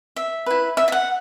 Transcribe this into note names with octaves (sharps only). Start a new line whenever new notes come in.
E5
E4 B4
E5
E5
F#5